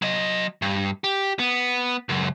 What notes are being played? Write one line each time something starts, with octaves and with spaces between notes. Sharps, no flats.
F#3 D#5
G2
G4
B3
C#2 F#2